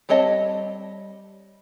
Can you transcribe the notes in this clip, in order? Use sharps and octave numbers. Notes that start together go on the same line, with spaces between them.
G3 C4 C#5 D#5 A5